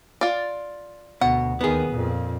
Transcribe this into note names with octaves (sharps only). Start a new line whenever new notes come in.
F4 D5
D2 B2 F#5
D#2 D#3 B3 G#4
F2 A#2